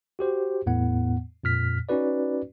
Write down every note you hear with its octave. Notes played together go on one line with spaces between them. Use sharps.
F#4 G4 C5
E2 A2 B3 F#5
F2 A#2 F6 B6
C#4 D#4 F#4 B4 D5